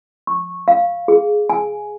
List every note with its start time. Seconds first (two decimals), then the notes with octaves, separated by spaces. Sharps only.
0.27 C#6
0.68 F5
1.08 G#4
1.50 G#5